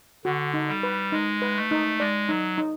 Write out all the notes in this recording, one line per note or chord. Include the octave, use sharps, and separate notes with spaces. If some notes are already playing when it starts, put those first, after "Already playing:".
D3 F#4
D#4
G3
B4
G#3 D#4
B4
A3
D#4
G#3 D5
F#3 D#4
D#4